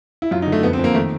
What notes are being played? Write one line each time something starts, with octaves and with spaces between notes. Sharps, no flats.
E4
F#2 F4
D#4
D3
A3
F2 B3
C4
F2
A#3
D#3 A3